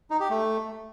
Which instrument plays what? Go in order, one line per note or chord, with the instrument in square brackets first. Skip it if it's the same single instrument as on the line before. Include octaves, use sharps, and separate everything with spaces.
[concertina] D#4
G4
A3